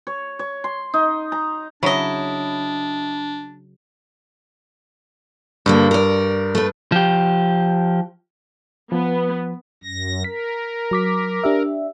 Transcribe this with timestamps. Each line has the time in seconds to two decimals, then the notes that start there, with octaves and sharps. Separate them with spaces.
0.07 C#5
0.39 C#5
0.64 C6
0.94 D#4
1.32 A#5
1.83 C#3 F#3 D4 E4 D#5
5.66 D2 G2 D3 A#3
5.91 A#4 D5
6.55 A3 B4
6.92 F3 G4
8.92 F3 B3
9.84 F#2 A#6
10.24 A#4 B6
10.91 F#3 D6 B6
11.44 D4 G4 E5